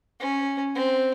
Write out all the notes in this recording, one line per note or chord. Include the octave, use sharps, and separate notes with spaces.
C#4
C4